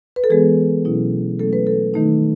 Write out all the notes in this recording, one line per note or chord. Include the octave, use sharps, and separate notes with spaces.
B4
A4
E3 G#3 B3 G#4
B2 F#3 C#4 E4
F#3 A3 C#4 A4
B4
A4
D#3 A3 D#4